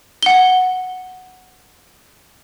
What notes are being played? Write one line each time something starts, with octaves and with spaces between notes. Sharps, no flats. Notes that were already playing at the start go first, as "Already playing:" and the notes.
F#5 G7